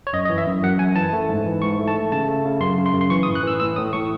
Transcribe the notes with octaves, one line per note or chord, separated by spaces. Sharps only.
C#5
F#2 D#5
D#5
E3
E5
F#2
F#2 F#5
F#2 G#5
E3 A5
A3
G#2
E3
G#2 C#6
A3
A5
A3
C#3 A5
A3
C#3
F#2 C6
C#3
C6
F#2
C6
E3 C#6
D#6
A2
F#6
E3 E6
A2 E6
A2 D#6
A2 C#6